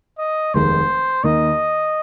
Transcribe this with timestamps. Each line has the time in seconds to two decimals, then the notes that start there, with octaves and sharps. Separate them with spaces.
0.18 D#5
0.54 F1 D#2 D#3 G#3 D#4 C5
1.23 D#2 D#3 A#3 D#4 D#5